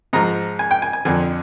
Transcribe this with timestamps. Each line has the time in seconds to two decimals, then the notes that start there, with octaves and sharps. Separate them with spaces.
0.13 G#2 F3 A#5
0.59 G#5
0.71 G5
0.82 G#5
0.93 G#5
1.05 F2 D3 F3 G#5